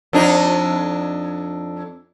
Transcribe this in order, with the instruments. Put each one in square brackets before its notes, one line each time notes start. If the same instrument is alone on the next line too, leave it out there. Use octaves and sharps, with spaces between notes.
[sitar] F2 D4 D#4